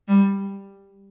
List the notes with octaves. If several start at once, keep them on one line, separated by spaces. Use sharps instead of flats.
G3